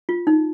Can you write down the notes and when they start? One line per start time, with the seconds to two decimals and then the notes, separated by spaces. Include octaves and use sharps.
0.09 F4
0.27 D#4